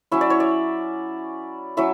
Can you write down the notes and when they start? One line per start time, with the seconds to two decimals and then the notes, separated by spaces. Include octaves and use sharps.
0.11 F#3 C#4 E4 E5
0.21 D5
0.30 C#5
0.40 D5
1.77 F#3 C#4 E4 E5